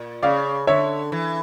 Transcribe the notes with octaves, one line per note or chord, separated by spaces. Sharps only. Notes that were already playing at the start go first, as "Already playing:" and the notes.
Already playing: A#2
C#3 D5 F5
D3 C#5 E5
E3